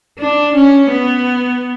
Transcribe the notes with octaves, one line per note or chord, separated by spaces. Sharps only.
D4
C#4
B3